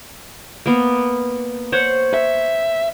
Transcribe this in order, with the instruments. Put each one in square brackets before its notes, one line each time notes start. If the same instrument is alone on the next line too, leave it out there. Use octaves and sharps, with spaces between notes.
[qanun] A#3 B3
C5 C#5 F#5
[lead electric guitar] E5